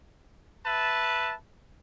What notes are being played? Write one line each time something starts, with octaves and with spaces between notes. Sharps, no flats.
B4 E5 A5